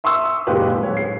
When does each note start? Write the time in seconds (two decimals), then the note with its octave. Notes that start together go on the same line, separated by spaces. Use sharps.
0.04 E5 C6 C#6 D#6 E6
0.47 F#1 D#2 A#2 G#3 G4 B4
0.79 D1 C#5
0.97 C7